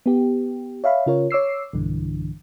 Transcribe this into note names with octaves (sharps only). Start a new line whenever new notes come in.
B3 G4
C#5 E5 F5 B5
C#3 F4 A#4 C#5
C#5 D6 E6 C7
B1 G2 D3 E3